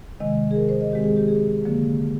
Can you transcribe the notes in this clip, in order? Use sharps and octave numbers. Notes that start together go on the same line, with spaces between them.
C3 D#3 G#3 D#5
G#4
A#4
C5
D#5
D#3 G#3 C4 G4
G#4
G4
G#4
D3 F3 A#3